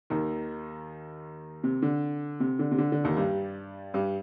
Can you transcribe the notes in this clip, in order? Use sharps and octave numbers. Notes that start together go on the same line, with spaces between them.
D#2 D#3
C3
D3
C3
D3
C3
D3
D3
D#2 D#3
G2 G3
G2 G3